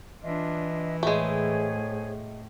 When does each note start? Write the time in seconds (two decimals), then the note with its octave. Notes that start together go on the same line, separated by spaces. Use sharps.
0.23 E3 D4 F4 D#5 E5
1.03 A2 G#3 A3 G#4 C5 C#5